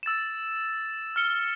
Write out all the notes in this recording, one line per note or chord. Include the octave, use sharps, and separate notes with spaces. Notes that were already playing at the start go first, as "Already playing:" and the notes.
E6 A6 E7
F6 C#7 G7